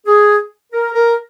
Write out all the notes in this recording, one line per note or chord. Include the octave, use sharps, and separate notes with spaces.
G#4
A#4
A#4